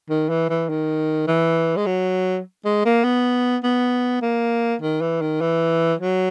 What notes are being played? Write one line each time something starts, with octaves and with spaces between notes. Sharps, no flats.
D#3
E3
E3
D#3
E3
G#3
F#3
G#3
A#3
B3
B3
A#3
D#3
E3
D#3
E3
F#3